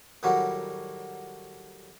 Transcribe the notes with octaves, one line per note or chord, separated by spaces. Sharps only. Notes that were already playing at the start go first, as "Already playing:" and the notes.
A2 D#3 F#3 G3 F#4